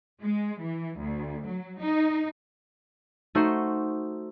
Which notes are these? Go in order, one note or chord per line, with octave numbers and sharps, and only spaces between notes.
G#3
E3
D2
F#3
D#4
A3 D#4 F#4 C5